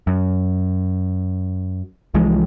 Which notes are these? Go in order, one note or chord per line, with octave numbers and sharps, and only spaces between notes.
F#2
C2 E3 F3 G#3